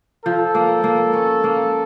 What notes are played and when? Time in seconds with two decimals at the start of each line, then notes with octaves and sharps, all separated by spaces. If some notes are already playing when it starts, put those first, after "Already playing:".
0.25 F3 A4
0.55 A#3
0.84 A#3
1.13 C#4
1.44 A#3